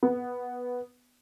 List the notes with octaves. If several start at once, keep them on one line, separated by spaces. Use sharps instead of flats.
B3